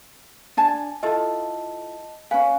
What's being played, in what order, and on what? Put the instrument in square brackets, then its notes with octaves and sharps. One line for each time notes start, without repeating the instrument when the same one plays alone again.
[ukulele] D4 G#5 A5
[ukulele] E4 F4 A4 [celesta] D#5 A5
[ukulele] C#4 B4 [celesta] F5 G#5